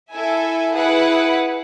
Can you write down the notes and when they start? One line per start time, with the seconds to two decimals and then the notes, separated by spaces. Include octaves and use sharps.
0.12 E4 A4 E5 G#5
0.75 E4 G#4 B4 F#5